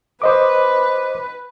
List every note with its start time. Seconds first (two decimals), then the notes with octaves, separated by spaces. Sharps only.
0.22 B4 C5 D#5 D6